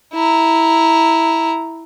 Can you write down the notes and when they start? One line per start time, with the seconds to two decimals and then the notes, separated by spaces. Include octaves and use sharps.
0.13 E4 A#5